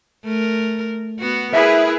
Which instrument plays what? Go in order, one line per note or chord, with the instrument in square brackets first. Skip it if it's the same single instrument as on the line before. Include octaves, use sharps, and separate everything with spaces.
[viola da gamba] A3 A#4
B3 F#4
[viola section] E4 G#4 B4 [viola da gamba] A#4 [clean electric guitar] E5